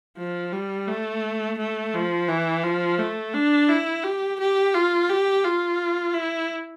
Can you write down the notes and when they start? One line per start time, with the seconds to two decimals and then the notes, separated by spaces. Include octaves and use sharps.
0.18 F3
0.52 G3
0.88 A3
1.58 A3
1.94 F3
2.28 E3
2.63 F3
2.99 A3
3.34 D4
3.68 E4
4.04 G4
4.40 G4
4.74 F4
5.09 G4
5.45 F4
6.14 E4